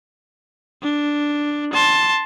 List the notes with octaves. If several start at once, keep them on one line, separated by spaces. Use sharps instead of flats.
D4
A5 C6